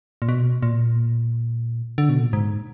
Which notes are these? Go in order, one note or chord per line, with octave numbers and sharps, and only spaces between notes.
A#2
B2
A#2
D3
B2
A#2
G#2